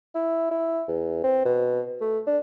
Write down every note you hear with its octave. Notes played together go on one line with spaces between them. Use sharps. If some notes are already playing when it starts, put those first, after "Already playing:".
E4
E4
E2
C4
B2
A3
D4